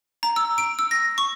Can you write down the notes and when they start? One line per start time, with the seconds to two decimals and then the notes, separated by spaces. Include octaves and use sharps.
0.23 A#5
0.36 E6
0.58 D7
0.79 E6
0.91 A#6
1.18 C#6